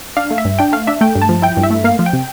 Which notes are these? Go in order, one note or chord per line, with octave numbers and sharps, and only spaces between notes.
D4 F5
A3
E5
G2
D4 G5
A3 F5
D4 E5
A3 G5
G2
A5
F3
E4 G5
G2
E5
A3
A#3 F5
F3
G5
C3